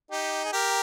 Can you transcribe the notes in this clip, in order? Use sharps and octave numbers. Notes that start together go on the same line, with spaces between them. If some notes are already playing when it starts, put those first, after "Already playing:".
D#4 G4
G#4
G4 A#4